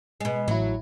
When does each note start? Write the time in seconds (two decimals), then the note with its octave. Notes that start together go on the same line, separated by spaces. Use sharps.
0.20 B2 G#3
0.48 A1 F#3 E4